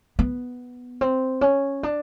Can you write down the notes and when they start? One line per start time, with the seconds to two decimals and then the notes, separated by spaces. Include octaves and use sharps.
0.19 B3
1.01 C4
1.41 C#4
1.83 D4